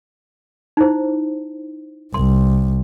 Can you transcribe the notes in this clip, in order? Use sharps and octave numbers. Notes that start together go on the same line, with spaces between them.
D#4 E4 C5
C2 C6